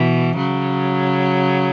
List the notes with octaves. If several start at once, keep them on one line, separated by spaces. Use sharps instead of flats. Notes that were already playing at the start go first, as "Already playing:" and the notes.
Already playing: B2 E3
C#3 F#3